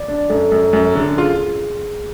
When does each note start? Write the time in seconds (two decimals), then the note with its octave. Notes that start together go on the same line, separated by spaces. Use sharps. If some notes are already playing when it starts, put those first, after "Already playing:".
Already playing: D5
0.08 D4
0.30 F#2 A4
0.52 F#2
0.73 F#2
0.96 D3
1.17 F4 G#4